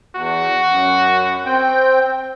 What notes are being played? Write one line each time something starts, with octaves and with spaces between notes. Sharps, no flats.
E2 F#4
F#2
C4 G5